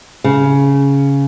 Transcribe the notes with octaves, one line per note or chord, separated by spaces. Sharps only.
C#3